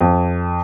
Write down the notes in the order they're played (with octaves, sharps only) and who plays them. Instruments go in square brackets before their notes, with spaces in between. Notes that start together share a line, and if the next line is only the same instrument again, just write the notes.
[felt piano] F2